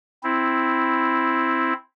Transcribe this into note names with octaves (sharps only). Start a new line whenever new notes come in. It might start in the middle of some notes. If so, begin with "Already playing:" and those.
C4 E4